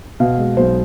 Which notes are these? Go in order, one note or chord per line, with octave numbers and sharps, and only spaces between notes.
B2 F5
G#3
B1 C5